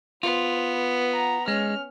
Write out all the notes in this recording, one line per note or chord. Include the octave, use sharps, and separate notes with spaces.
B3 F4 C5
B4
F#5 A#5
G#3 C#4 F6